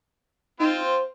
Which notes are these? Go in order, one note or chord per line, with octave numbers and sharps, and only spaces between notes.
C4 D#4 F4
C5